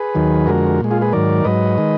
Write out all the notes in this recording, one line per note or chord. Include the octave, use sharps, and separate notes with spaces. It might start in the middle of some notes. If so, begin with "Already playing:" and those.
Already playing: G#4 B4
D#2 D#3 F#3
F2 D3 G#3 F#4 A#4
A#2 G#3
F4 G#4
G#4 B4
G#2 D#3 F#3 A#4 D5
G#2 F#3 B4 D#5
D#3 G#3